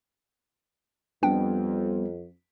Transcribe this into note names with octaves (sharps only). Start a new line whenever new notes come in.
F2 G3 B3 D4 G5